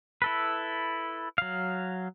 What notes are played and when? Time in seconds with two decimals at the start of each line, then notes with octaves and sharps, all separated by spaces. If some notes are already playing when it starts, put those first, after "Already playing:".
0.22 E4 A4 B4
1.38 F#3 F5